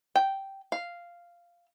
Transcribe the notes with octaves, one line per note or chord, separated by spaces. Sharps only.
G5
F5